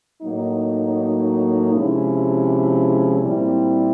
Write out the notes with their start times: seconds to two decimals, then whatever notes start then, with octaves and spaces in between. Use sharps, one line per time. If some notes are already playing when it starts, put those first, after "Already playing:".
0.22 A2 F#3 A#3 D#4
1.71 C3 F3 G#3 C#4 E4
3.21 A#2 G3 C4 E4